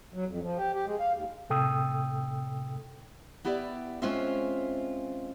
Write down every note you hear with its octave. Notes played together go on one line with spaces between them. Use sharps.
F#3
F2
F3
G4
G4
G#3
F5
D#2
A2 C3 A4 G5 D#6 E6
B3 E4 G4 D5 E5
G#3 C4 C#4 F4 C5 E5